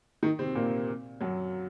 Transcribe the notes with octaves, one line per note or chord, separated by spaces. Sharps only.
D#3 D#4
C3 C4
A#2 A#3
F#2 F#3